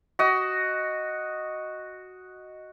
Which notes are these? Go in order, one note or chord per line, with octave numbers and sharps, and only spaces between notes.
F#4 D#5